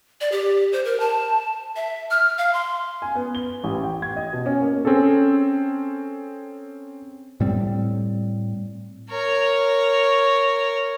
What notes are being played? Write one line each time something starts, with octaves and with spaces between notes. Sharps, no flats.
D5
G4
C5
A#4
A5
E5
F6
F5
C6
G#5
B3
G7
A1
G5
G#6
D#5
B2
C#4
A#3
C4 C#4 G#4 A4
A2 G3 C4
A#4 C#5